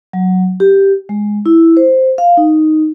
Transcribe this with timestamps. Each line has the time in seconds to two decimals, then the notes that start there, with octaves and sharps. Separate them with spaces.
0.13 F#3
0.60 G4
1.09 G#3
1.46 E4
1.77 C5
2.18 F5
2.37 D#4